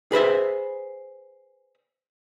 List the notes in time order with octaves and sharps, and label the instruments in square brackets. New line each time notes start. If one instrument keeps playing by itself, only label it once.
[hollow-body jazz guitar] G#4 B4 C5 E5